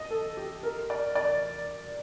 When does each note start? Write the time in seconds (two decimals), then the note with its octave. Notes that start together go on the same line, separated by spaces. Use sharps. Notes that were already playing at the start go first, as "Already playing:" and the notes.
Already playing: D#5
0.11 A4
0.37 G4
0.63 A#4
0.90 D5
1.15 D5